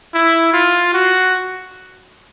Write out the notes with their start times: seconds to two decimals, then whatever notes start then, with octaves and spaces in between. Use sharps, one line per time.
0.14 E4
0.53 F4
0.93 F#4